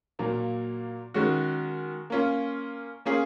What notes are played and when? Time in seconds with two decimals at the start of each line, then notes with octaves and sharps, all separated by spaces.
0.19 A#2 F#3 A#3
1.14 D#3 G#3 C#4 F#4
2.10 A#3 C#4 F4
3.05 A#3 C#4 F4 G#4